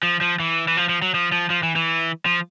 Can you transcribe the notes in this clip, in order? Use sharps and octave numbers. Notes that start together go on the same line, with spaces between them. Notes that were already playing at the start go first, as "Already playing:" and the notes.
F3
F3
E3
E3
F3
F3
F#3
F3
F3
F3
E3
E3
F3